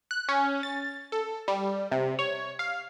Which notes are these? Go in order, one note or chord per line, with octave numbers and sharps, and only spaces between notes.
F#6
C#4
A6
A4
G3
C3
C#5
F5